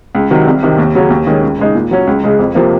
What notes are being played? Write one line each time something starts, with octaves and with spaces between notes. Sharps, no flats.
C#2
C3 D#3 F#3
C2
C3 D#3
D#2
C#3 F#3 C#4
D#2
D#3 G#3 C#4
C#2
C#3 G#3 D#4
A#2
F#3 C#4
C#2
C#3 G#3
F2
C3 F3 A#3